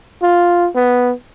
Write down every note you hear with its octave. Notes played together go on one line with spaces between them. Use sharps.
F4
B3